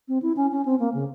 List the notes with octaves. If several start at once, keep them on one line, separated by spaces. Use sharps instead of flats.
C4
E4
C#4
C#4
C4
A#3
C#3